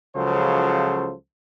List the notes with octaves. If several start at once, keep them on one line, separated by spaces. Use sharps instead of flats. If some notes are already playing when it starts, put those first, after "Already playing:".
C#2 C#3 F3 F#3 A4 C5